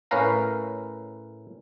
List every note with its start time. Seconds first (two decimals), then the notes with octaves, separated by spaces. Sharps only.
0.11 A2 C#4 A#4 B4 F5 A#5